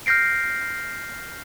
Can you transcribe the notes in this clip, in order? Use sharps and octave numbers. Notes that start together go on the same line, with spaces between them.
F6 G6 A#6 C7 D7